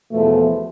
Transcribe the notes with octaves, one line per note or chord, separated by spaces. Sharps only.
E2 B2 F3 A3